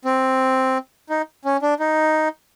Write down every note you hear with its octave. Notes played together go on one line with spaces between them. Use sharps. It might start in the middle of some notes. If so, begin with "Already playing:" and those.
C4
D#4
C#4
D4
D#4